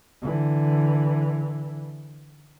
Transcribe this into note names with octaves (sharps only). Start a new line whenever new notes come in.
D3 E3